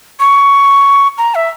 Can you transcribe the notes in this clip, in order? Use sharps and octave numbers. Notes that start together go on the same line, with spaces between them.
C#6
A#5
E5